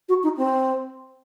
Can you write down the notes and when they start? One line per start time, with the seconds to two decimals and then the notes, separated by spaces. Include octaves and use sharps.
0.09 F#4
0.23 D#4
0.37 C4